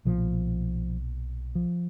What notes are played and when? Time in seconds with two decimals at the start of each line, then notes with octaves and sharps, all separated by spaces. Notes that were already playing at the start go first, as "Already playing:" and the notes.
0.05 B1 A#2 F3
1.55 F3